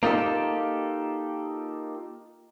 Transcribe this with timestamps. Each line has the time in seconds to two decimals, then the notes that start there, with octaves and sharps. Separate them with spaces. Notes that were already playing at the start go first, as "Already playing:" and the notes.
0.03 A#3 D#4 F4 G4 A4